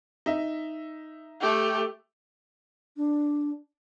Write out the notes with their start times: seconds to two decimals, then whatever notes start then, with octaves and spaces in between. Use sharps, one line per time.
0.26 D#4 E5
1.41 A3 G4
2.96 D4